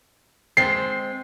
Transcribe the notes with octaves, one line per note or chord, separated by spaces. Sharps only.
G#3 C4 C7